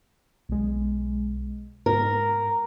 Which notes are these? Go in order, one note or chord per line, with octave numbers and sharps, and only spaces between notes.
B1 G#3
G#2 A#4